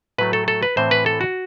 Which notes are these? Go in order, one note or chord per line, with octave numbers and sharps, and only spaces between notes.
A2 F#3 A3 B4
A4
A4
B4
A2 E3 A3 C4 C5
B4
A4
F#4